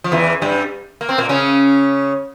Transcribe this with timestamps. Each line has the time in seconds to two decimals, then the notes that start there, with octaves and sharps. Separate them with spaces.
0.04 F3
0.12 E2 E3
0.42 G2 G3
1.01 A#3
1.09 C4
1.18 A#2 A#3
1.29 C#3 C#4